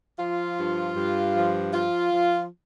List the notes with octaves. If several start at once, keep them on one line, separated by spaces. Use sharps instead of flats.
F3 F4
G2
G2
F3
F3 F4
F3